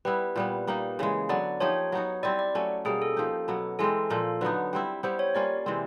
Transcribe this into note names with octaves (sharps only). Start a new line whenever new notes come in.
G3 B3 E4 B4
A#2 G3 B3
G3 A#3 D#4
C#3 E3 G#3
D3 F#3 B3 D5
F3 A#3 D#4 G4 C#5
F#3 B3 D#4 F#4
G3 C4 E4 D5
D5
F#3 A3 C#4
B2 G3 A#3 G#4
A4
F3 A#3 D#4 G4
B2 F#3 B3
E3 G#3 C4 A4
A#2 F3 A#3 A4
D3 F#3 B3 D#4 B4
G3 C4 E4
G3 B3 E4 G4 C5
C#5
G3 A#3 C#4 F4 D5
C3 E3 G#3 C4